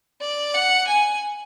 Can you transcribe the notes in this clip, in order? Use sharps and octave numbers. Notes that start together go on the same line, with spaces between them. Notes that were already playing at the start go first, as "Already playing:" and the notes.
D5
F#5
G#5